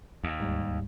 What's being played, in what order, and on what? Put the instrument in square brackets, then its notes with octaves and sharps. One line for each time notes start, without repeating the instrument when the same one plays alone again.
[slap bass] D#2
[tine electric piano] D2 G#2 G3